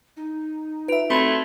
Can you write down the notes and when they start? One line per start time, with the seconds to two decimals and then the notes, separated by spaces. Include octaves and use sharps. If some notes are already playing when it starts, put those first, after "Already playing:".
0.17 D#4
0.88 F4 B4 E5 D7 F7
1.10 A3 C4 F#4 B5 C6 G#6